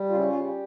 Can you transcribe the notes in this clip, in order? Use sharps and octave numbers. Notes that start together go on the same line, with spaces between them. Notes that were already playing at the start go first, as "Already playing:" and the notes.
Already playing: G3
C#3 F4
E4
C#4 F4
G3